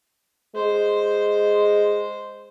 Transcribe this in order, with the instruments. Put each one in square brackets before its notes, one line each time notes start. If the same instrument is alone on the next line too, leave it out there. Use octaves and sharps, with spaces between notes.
[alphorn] G#3 [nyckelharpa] C5